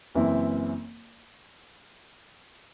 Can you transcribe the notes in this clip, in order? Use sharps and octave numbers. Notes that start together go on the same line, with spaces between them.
F#1 F#2 E3 C4 E4